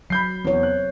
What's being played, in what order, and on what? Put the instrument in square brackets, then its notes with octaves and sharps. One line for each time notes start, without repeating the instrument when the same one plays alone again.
[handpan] F#3 [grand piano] B5 G6 C7
[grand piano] E2 [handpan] C4 C#5
[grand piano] F#6